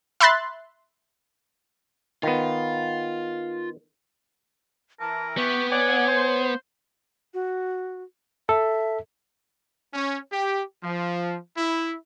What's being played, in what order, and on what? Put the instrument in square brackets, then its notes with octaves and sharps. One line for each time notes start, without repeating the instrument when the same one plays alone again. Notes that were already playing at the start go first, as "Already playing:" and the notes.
[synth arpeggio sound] E5 B5 C6 F#6 A6
[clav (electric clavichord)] D#3 B3 [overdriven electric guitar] F4
[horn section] E3 [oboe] A#4 [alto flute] A5
[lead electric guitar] B3 [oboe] G4 [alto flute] C#6
[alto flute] C#5 [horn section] D5 F#5 [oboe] G#5
[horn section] C5
[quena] F#4
[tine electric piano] A4 [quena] E5
[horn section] C#4
G4
F3
E4